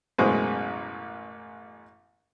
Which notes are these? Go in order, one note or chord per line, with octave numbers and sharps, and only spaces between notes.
A1 F#2 B2 G#3 B4 C5